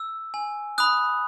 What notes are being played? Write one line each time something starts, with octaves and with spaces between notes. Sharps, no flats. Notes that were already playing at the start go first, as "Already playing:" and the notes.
Already playing: E6
G#5
B5 D#6 F#6